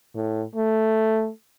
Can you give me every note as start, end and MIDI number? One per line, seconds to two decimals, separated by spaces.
0.15 0.43 45
0.56 1.30 57